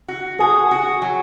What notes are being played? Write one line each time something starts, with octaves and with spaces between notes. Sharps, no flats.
F#4
F#4 G#4
F#4
F#3